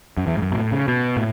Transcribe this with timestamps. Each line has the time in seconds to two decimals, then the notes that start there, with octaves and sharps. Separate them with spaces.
0.17 F#2
0.27 E2
0.37 G#2
0.42 F#2
0.51 B2
0.57 A2
0.72 C#3
0.88 B2
1.17 A2